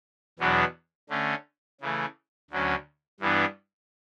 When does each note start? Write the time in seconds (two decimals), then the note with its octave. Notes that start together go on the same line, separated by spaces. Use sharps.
0.39 E2 B2 F#3 B3 D4
1.09 D3 A3 C#4
1.81 C#3 E3 A3
2.50 D2 D3 F#3 C#4
3.20 G2 E3 B3 D4